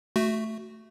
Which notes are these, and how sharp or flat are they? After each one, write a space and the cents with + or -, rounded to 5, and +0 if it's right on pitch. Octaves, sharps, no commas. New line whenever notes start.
A3 +0 F#4 +0